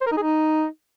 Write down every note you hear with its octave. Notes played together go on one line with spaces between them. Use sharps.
C5
A#4
D#4
G#4
D#4